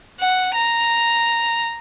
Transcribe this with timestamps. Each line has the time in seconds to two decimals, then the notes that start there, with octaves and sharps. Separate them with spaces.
0.20 F#5
0.54 A#5